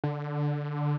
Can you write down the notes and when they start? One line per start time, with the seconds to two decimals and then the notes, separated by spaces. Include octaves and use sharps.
0.04 D3